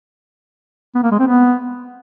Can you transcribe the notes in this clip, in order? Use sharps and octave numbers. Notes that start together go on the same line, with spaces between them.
B3
A#3
G#3
C4
B3